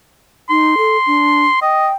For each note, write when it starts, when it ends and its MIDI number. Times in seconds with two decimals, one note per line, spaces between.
0.50 0.75 63
0.50 1.61 84
0.78 0.97 69
1.07 1.44 62
1.62 1.88 75
1.62 1.93 79